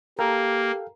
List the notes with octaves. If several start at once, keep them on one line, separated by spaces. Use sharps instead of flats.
A#3 G4 A4 A#4 F5 G5